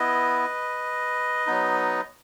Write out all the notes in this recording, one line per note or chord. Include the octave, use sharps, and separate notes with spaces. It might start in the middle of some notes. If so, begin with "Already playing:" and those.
Already playing: B3 E4 B4 D#5
F#3 B3 D#4